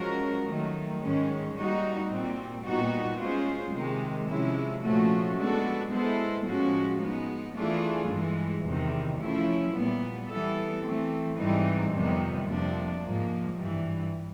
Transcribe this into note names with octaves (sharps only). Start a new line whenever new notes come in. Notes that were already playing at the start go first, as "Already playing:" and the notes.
Already playing: F3 G#3 C#4 F#4 A#4
D#3 F#3 A3
G#2 D#3 G#3 C#4
G3 A#3 D#4 F#4
A#2 G3 C4
A#2 G3 B3 D#4 F#4
G#3 C#4 F4 G#4 C5
C3 D#3 G#3
C3 F3 G#3 C#4 E4
A#2 F3 A3 C#4 F#4
G#3 B3 D4 F#4 A4
G#3 B3 E4 A4 C5
A2 F3 G#3 C#4 F#4
G#3 B3 D#4
E3 A3 D4 F4 G#4
G2 E3 G#3
E2 C3 D#3
F3 A3 C#4 E4
A#2 G3 B3
E3 G3 B3 E4 A4
E3 A3 C4
G#2 E3 G3 C4 D#4
F2 C3 D#3 G3 B3
F2 C3 F3 A#3 D4
G#2 F3 A#3
G2 E3 G3